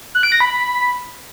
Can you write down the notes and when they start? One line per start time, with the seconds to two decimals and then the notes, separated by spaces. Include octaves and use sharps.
0.15 F#6
0.23 D7
0.32 A#6
0.40 B5